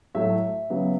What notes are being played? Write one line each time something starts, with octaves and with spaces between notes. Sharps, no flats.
A2 F#3 A3 E5
C#3 F#3 B3